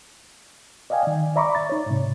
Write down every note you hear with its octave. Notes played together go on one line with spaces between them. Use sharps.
D5 D#5 F5 G5 G#5
D#3
D5 E5 A#5 B5 C#6 D6
A6
D#4 C#5
G#2 C3